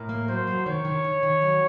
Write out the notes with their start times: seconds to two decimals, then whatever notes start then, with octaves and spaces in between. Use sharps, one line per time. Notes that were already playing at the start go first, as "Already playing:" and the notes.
Already playing: A2 A#4
0.09 A#3
0.28 F#3 C5
0.47 F#3
0.66 D#3 C#5
0.85 D#3
1.05 D#3
1.23 D#3
1.42 F#3